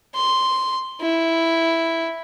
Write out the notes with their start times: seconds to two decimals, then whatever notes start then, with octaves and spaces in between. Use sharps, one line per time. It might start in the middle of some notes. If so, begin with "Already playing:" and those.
0.15 C6
1.01 E4